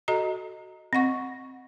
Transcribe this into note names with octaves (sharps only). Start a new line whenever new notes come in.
F#4 A4 D#5 A#5
C4 D#5 F#5 C#6